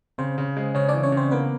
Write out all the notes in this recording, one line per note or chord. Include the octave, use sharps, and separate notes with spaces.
C#3 C4 C5
C#3
G#3
C#3 C#4 C#5
E3 D4 D5
C#4 C#5
C#3
C4 C5
A#3 B3 B4